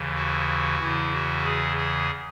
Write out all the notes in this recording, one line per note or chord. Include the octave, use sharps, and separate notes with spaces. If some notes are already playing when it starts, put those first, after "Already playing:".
Already playing: D#2 C#3 E3
F#4
E2 C#3 E3 E4
F#4
G#4
G#4